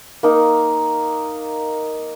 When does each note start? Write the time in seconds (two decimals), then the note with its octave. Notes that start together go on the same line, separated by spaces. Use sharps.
0.23 A#3 D#4